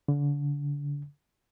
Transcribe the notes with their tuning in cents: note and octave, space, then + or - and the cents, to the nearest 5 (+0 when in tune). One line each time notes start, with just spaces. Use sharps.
D3 -35